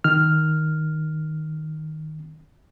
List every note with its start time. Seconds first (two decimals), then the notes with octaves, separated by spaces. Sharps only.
0.04 D#3 F6